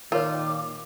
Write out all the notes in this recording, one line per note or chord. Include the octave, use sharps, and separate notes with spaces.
A#2 D#3 F4 A#4 B4 C#5 D6